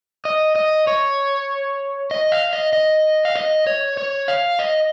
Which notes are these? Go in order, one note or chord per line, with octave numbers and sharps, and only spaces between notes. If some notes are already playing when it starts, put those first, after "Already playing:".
D#5
D#5
C#5
D#5
F5
D#5
D#5
F5
D#5
C#5
C#5
F5
D#5